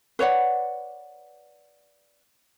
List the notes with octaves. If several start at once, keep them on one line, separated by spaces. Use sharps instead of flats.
B4 C#5 D5 F#5